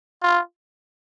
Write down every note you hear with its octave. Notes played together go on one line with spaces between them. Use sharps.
F4